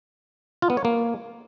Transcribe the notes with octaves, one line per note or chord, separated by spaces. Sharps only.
F4
B3
C#5
A#3